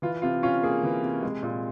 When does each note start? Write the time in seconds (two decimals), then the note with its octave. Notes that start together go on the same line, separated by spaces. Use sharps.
0.02 E3 F4
0.22 C3 F4
0.43 C#4 F4
0.63 A#3 G#4
0.83 E3
1.03 C3
1.22 G#3
1.43 A#2